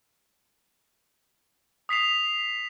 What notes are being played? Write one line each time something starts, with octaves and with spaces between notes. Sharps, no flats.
D#6 B6 C7 F7